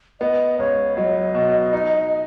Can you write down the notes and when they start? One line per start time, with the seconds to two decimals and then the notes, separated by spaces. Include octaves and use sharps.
0.21 B3 D#5
0.59 C#2 C#5
0.97 F#3 D#5
1.35 B2
1.73 D#4